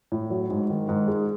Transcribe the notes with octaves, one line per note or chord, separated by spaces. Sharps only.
A2
F#3
G#2
D#3
G#2
G#3